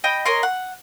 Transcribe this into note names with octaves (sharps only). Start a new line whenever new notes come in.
D#5 G5 B5
A#4 C#5 D#5 C6
F#5